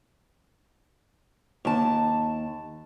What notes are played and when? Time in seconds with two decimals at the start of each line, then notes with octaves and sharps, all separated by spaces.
1.65 D#2 A5